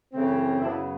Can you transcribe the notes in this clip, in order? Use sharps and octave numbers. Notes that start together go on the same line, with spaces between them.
F#2 C#3 E3 A3 C4
F#2 C#3 F#3 B3 D4 E4